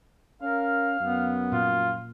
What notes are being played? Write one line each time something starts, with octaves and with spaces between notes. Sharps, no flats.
C#4 A#4 F5
F#2 B3
A#2 F4